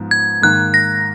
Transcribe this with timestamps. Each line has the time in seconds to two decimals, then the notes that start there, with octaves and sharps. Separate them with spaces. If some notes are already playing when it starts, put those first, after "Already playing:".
Already playing: G#2 F3 B3
0.11 G#6
0.42 G#2 D#3 A#3 F#6
0.74 A#6